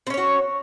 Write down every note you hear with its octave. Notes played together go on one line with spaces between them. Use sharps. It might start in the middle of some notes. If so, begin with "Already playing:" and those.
C4 C#4 F#4 C#5